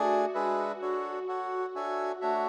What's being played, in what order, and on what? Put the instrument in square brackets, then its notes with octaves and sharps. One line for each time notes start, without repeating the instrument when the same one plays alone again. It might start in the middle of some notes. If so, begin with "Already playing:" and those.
Already playing: [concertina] A3 D4 G#4 D5 G#5 [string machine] F#4
[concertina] G#3 D4 G#4 B4 E5 [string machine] F#4
[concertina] D4 F#4 A4 C#5
F#4 A4 C#5 F#5
D4 A4 C#5 E5 G#5
A3 D4 F#4 C#5 E5